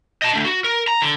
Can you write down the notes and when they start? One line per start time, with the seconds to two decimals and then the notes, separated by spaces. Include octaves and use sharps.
0.22 D#5 A5
0.34 A3 D4
0.45 F#4
0.64 A#4
0.87 A#5
1.02 D3